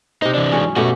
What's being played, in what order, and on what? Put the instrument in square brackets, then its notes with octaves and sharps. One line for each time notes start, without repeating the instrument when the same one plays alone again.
[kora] C3 C5 [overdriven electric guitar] D#4
[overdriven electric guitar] E3 D4
[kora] G#2 F#3 C#4
[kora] B2 A3 G4 [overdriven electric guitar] C#4 F#4